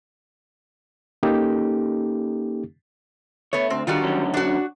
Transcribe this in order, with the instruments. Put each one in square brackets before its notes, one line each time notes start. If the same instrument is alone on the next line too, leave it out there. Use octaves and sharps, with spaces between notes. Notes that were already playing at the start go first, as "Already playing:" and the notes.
[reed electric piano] A#3 C#4 D#4 G4 A4
[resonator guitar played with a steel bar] A3 B3 [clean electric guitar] C#5
[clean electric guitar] D2 [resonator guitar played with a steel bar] C4
[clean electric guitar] D3 F4 [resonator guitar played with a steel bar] D#3 G3 F#4
[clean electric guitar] D3 F#3 C#4
[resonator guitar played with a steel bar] D4 F#4